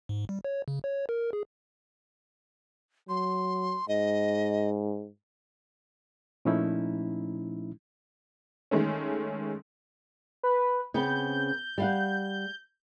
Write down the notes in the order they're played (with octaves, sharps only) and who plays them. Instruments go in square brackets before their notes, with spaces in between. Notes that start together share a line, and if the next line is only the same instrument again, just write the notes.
[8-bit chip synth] G#2
G3
C#5
C#3
C#5
A#4
G#4
[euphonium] F#3 [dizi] C6
[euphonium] G#2 [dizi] D#5
[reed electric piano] A#2 F3 A3 C#4 D#4 E4
[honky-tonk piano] D#3 G#3 A3 C#4
[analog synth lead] B4
[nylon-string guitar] C#3 B3 C4 [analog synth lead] G6
[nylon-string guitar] G3 F5 F#5